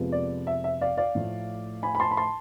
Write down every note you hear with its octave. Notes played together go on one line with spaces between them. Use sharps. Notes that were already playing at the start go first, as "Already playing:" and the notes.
Already playing: F2 C3 F3 G#3 B3
D5
E5
E5
D5 F5
D5 F5
A2 F3 A3
G#5 B5
B5
A5 C6
B5
A5 C6